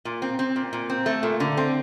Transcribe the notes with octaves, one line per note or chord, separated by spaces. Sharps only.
A#2
C4
C4
A#2
A#2
C4
A3
A#2
D3
C4